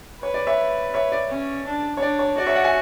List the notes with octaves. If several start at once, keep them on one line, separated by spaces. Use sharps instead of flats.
B4 C#5
D5
C#5 E5
C#5 E5
D5
C#4
D4
C#5
D4 D5
C#5
F#4 D5
C#5 E5
D5 F#5
E5 G#5